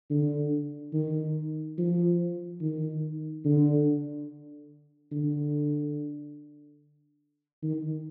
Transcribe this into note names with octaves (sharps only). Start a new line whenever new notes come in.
D3
D#3
F3
D#3
D3
D3
D#3